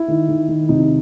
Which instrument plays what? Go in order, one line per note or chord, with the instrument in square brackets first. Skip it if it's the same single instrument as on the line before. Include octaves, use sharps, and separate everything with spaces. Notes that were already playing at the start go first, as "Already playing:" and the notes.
Already playing: [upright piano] E4
D#3
D#3
D#3
C3 D#4